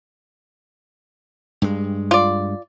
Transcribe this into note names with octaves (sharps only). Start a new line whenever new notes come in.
G2 G#3
F4 D5